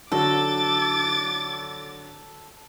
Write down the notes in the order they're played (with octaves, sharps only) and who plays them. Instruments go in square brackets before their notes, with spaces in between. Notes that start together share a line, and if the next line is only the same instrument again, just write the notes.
[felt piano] D3 F#3 F#4 [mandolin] A4 [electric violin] D6 A6